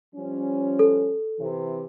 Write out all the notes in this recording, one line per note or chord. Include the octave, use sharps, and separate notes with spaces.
F3 G3 C#4
A4
C3 E3